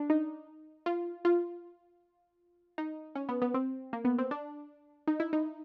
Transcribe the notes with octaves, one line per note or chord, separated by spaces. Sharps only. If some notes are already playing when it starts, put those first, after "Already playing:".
Already playing: D4
D#4
F4
F4
D#4
C#4
B3
B3
C4
A#3
B3
C4
D4
D#4
E4
D#4